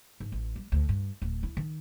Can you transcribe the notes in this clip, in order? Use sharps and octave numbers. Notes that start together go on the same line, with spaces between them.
G#2
A1
G3
D2
G2
D1
E4
D#3